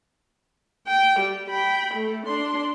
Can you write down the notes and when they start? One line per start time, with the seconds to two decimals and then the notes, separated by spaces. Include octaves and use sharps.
0.87 G5
1.19 G3
1.49 G5 B5
1.94 A3
2.26 D4 C6